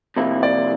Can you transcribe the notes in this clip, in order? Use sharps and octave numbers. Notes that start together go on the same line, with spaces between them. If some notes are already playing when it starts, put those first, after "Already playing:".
C2 C3 F3 A#3 E4
D5